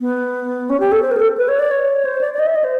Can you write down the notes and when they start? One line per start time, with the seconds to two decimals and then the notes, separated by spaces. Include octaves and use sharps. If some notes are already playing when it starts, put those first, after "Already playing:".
0.01 B3
0.70 C#4
0.80 G4
0.92 A4
1.02 C5
1.11 A#4
1.16 G#4
1.20 A4
1.37 B4
1.48 C#5
1.59 D5
1.71 C#5
2.05 C5
2.21 D5
2.34 D5
2.39 D#5
2.46 E5
2.55 D#5
2.64 C5